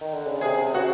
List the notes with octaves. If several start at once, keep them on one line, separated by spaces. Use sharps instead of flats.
D#3
D3
C#3
C3 G#4 G#5
C#3 F#4 F#5